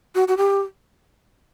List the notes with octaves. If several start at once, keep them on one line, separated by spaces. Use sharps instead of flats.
F#4
F#4
G4